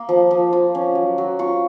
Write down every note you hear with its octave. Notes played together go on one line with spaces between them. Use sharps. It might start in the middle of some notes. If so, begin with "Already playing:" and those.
Already playing: A#3
F3
F3
F4
C#4
F#3
F#3
F4 C#6